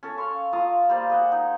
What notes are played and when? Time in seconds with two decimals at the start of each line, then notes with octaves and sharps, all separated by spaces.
0.03 C#4 A4
0.18 F5 C6 C#6
0.53 F4 F5 A#5 D#6
0.89 G3 A#3 C5 D5
1.10 G#4 D#5 F#5
1.32 D#4